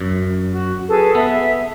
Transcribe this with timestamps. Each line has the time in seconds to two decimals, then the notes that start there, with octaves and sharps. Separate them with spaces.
0.01 F#2
0.54 F#4
0.89 G#4 A4 B4
1.14 B3 A4 E5